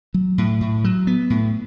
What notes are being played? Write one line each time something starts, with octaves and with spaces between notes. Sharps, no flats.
F#3
A2
A2
F#3
B3
A2